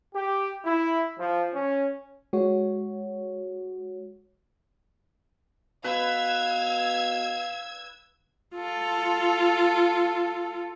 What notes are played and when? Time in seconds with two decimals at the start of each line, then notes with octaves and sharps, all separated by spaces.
0.15 G4
0.65 E4
1.18 F3
1.54 C#4
2.33 G#3 F#4 C#5
5.84 B2 B4 F5 E6 G#6
8.55 F4 A4